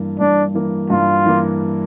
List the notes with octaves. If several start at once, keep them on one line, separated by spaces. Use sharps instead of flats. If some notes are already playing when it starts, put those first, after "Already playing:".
Already playing: G2 E3 A#3
G2 D4
E3 A#3
G2 F4
E3 A#3